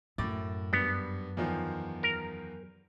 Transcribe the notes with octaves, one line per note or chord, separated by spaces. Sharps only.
F#2 A2 D6 A6
G2 B3
E2 D#3 F3
A#4